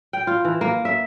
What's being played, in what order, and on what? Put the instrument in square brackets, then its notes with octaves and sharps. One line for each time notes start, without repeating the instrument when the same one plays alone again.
[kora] G5
F4
E3
A#3
E5